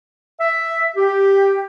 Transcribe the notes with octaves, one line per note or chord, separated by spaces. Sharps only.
E5
G4